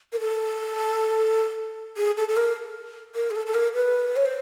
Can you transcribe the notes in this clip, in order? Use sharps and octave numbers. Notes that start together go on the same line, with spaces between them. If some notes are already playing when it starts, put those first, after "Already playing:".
A#4
A4
G#4
A4
A4
A#4
A#4
G#4
A4
A4
A#4
B4
C#5
C5